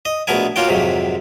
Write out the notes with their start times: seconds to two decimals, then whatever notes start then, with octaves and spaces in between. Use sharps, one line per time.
0.05 D#5
0.27 A#1 B2 A3 B3 A#4 G#5
0.56 A#3 C#4 F4 F#4 G5
0.68 F2 G#2 C3 D#3 F#3